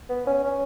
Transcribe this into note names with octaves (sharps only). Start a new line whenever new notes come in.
B3
C#4
C#4